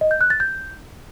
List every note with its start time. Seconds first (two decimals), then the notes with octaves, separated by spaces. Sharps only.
0.01 D#5
0.11 G6
0.21 F#6
0.30 A6
0.40 G6